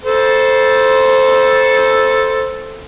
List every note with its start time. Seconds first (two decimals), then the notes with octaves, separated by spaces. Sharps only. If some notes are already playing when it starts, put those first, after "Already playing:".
0.04 A4 C5